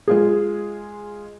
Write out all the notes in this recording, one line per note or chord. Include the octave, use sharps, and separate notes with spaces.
G#3 F4 G#4